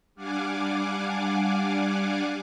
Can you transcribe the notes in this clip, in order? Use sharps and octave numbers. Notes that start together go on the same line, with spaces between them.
G3 D4 F5 F#5 G#5 D6